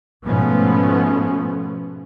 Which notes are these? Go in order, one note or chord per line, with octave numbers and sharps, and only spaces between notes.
G#2 B2 F3 A3 B3 C#4